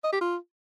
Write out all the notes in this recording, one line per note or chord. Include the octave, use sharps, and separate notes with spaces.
D#5
G4
F4